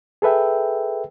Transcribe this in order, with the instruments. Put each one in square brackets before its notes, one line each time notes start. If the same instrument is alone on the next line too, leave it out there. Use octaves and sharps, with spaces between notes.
[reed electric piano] G#4 A4 B4 E5 G5